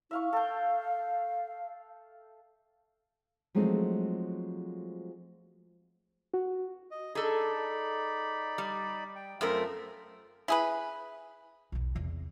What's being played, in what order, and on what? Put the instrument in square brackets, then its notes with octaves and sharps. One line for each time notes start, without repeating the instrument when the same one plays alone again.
[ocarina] E4 [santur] E5 F5 C#6
[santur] A4 G5 [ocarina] F5
[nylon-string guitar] F3 F#3 G#3 A3 C4 D#4
[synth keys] F#4
[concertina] D#5
[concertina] D#4 D5 B5 [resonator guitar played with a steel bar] G#4 A4
[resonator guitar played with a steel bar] G3
[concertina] G5
[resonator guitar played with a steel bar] F#2 A3 A#4 [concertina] C4 F4 B5
[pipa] E4 G#4 B4
[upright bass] B1 E2
E2 C3